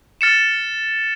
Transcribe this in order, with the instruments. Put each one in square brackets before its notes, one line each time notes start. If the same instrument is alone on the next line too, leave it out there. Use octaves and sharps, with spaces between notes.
[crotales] F6 A6 C#7 E7